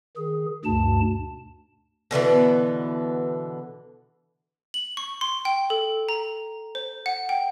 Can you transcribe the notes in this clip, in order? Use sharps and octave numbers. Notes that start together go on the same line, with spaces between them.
D#3 G#4
D2 G2 B2 A5
B2 D3 E3 B3
F#7
C#6
C6
G5
A4
A#5
C5
F#5
G5